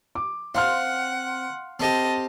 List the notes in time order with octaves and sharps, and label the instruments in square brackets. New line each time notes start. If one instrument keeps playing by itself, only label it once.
[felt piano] D6
[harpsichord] C4 [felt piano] F5 C6 F6 [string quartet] F#5
[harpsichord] C4 G4 [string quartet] A4 D#5